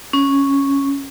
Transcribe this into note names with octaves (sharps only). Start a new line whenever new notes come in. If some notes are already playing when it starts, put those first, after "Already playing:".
C#4